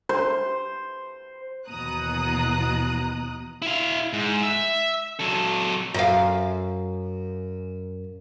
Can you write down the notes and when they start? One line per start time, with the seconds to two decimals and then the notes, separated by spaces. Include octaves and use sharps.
0.09 C5
1.68 D#2 B2 E3 A#5 D#6 F#6
3.62 E4 F5
4.13 G#2
4.43 E5
5.19 F#3 A4
5.94 F#2 F5